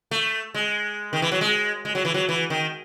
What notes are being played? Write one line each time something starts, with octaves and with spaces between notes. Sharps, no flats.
A3
G#3
D#3
E3
F#3
G#3
G#3
F#3
E3
F#3
E3
D#3